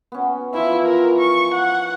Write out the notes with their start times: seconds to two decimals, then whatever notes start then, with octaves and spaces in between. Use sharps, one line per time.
0.12 B3 C#4
0.54 E3 F3 E4 E5
0.85 A#4
1.18 C#6
1.54 F#5